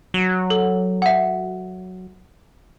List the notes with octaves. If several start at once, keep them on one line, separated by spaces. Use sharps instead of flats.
F#3
A4
E5 F#5